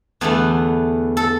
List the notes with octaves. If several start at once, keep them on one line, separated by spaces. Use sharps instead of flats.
E2 D3 A3 B3
A4